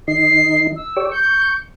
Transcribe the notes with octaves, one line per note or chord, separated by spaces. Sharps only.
D#3 D#4 C7
E6
G4 C#5 D5
C#6 G6